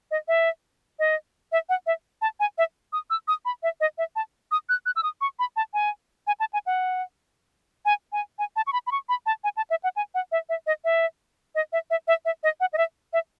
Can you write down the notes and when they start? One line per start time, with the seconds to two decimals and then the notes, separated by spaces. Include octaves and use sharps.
0.11 D#5
0.28 E5
0.99 D#5
1.52 E5
1.69 F#5
1.87 E5
2.22 A5
2.40 G#5
2.58 E5
2.93 D#6
3.10 E6
3.28 D#6
3.45 B5
3.63 E5
3.80 D#5
3.98 E5
4.16 A5
4.51 D#6
4.69 F#6
4.86 F#6
4.96 E6
5.03 D#6
5.21 C#6
5.39 B5
5.56 A5
5.74 G#5
6.27 G#5
6.40 A5
6.53 G#5
6.66 F#5
7.85 G#5
8.12 G#5
8.39 G#5
8.56 A5
8.67 C#6
8.73 B5
8.87 B5
8.92 C#6
9.09 B5
9.26 A5
9.44 G#5
9.57 A5
9.70 E5
9.83 F#5
9.96 G#5
10.14 F#5
10.32 E5
10.49 E5
10.67 D#5
10.84 E5
11.55 D#5
11.73 E5
11.90 E5
12.08 E5
12.25 E5
12.43 D#5
12.60 F#5
12.73 D#5
12.78 E5
13.13 E5